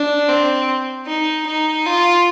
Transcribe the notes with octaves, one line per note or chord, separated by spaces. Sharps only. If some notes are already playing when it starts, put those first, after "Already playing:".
Already playing: D4
C4
D#4
D#4
F4